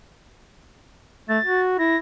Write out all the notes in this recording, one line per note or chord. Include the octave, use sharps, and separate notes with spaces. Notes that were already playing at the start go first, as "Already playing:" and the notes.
A3 A6
F#4
E4 A#6